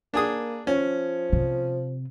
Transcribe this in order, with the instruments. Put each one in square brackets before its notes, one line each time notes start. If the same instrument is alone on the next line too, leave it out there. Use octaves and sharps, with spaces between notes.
[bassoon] A#3 [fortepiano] D4 G#4 D#6
[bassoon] F3 [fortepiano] C#4
[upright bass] C3